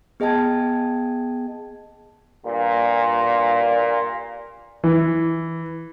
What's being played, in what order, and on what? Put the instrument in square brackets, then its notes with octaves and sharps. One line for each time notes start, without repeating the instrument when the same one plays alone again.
[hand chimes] B3 G#4 D#5 G5 A5 G#6
[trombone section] G2 A#2
[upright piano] E3